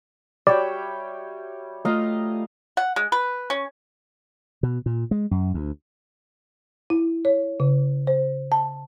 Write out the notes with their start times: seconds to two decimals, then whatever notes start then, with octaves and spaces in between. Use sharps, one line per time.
0.47 G3 F#4 C#5 D5 E5 G5
1.85 A3 F4 D#5 F5 A#5
2.77 F#5
2.96 G#3
3.12 B4
3.50 C#4
4.63 B2
4.86 A#2
5.11 G#3
5.31 F#2
5.54 D2
6.90 E4
7.25 C#5
7.60 C#3
8.07 C5
8.52 A5